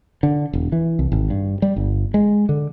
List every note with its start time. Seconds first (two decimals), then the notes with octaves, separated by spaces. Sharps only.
0.23 D3
0.53 E1
0.72 E3
0.99 C2
1.12 G#1
1.30 G2
1.62 G3
1.76 G1
2.14 G#3
2.49 D3